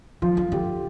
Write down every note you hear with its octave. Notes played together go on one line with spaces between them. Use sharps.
F3 F4
F3
D3 G4